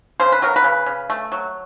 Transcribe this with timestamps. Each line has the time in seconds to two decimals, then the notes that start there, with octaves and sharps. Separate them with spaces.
0.20 C#3 C5
0.32 B4
0.42 F#3 A#4
0.56 B4
0.64 C#3
0.86 C#3
1.10 A3
1.32 F#3